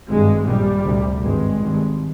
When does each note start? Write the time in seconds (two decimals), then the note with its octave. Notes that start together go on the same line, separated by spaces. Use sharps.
0.08 G#1 G2 G#3
0.46 A#1 A#2 G3
0.85 D2 C3
1.22 G#1 G2 G#3
1.61 G#1 G2